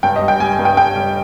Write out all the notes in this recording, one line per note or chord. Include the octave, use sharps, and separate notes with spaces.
G2 G5
D#5
G3
G5
G3 G#5
G#5
G2
G5
G2 G5
G3